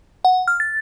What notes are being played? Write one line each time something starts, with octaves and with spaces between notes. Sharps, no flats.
F#5
F6
A6